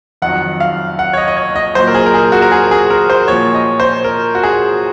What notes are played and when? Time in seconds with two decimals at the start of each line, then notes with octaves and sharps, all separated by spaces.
0.22 F2 D#3 F#3 F#5
0.60 F5
0.99 F#5
1.13 C#5
1.17 D#5
1.28 D#5
1.36 C#5
1.56 D#5
1.75 A#2 F#3 C5
1.87 A#4
1.95 G#4
2.06 A#4
2.14 G#4
2.32 F#4
2.42 A#4
2.52 G#4
2.71 G#4
2.90 A#4
3.10 C5
3.28 A#2 F3 C#5
3.54 D#5
3.80 C5
4.04 A#4
4.35 F#4
4.43 G#4